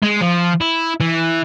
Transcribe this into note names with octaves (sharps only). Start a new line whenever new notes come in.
G#3
F3
E4
E3